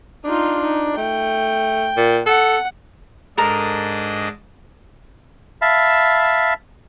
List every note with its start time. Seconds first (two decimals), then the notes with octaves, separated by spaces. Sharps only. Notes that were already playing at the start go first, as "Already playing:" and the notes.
0.24 D4 D#4 F4
0.61 D#4
0.97 A3 G5
1.97 A#2
2.26 A4 F#5
3.37 G#2 D4 A4 A#4 D#5
5.62 E5 F5 A5 B5